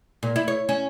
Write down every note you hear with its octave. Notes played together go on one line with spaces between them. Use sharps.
A#2
E4
C#5
C#4